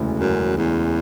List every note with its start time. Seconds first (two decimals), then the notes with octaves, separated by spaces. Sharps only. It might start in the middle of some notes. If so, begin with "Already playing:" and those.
Already playing: E1 D2 C#3 E3 A3
0.20 F#2
0.57 E2